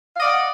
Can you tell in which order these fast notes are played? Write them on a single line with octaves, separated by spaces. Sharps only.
F5 D#5 D5 F#5